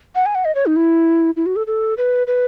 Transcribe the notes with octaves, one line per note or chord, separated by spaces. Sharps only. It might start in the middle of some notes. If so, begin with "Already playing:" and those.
F#5
G#5
F#5
D#5
C#5
D#4
E4
E4
F#4
A4
A4
B4
B4